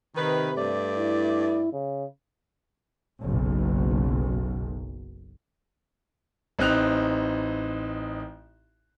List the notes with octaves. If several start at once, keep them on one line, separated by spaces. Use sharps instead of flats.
C3 D#3 B4
G2 A3 D5
E4
C#3
F#1 B1
A1 C4 D#4 F#6 F7